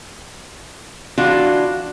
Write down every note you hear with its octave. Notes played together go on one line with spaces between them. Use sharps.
E3 D4 F4 F#4